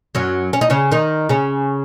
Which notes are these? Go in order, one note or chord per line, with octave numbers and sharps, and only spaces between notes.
F#2 F#3
C#4
D#4
C#3 C#4
D#3 D#4
C#3 C#4